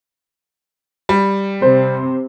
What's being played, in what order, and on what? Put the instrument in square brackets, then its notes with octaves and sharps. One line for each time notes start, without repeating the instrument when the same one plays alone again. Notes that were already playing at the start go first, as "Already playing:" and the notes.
[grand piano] G3
[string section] C3 [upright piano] C5